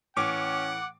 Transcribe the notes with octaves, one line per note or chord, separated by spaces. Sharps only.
A2 E3 C#4 F#5 D6